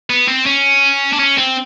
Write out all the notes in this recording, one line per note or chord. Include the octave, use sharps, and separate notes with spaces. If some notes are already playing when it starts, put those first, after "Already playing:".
B3
C4
C#4
D4
C#4
C4